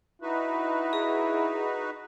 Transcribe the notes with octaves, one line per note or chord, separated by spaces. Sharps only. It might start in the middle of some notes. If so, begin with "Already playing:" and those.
D#4 E4 F#4 B4
G#4